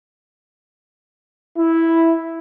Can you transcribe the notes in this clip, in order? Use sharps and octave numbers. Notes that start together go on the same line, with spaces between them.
E4